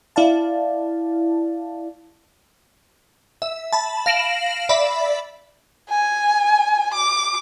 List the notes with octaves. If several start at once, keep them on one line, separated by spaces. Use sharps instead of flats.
E4 D5 F5 A5
E5
A5 B5
F5 A#6 D7 E7 F#7
D5 E5 B5
G#5
D6